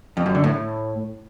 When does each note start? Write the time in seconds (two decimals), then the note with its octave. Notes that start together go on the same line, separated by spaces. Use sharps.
0.17 F2
0.26 F#2
0.35 D3
0.44 A2